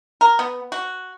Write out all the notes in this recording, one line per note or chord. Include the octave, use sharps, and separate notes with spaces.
A#4
B3
F#4